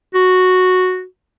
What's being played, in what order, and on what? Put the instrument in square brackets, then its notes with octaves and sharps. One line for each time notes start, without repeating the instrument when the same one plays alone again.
[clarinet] F#4